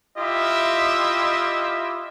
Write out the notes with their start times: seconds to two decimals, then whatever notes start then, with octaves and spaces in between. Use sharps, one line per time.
0.18 E4 F4 G4 D#5 E5